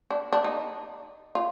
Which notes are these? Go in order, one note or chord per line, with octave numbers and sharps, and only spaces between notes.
D4
D4
D#4
F4